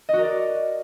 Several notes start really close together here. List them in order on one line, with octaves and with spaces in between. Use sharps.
D#5 F#4 A#4 D5